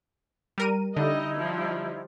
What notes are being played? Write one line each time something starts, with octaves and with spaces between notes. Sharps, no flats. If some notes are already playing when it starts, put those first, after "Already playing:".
G3 A#4 D#7
D3 G3 D#4 E4 D#5
F3 G3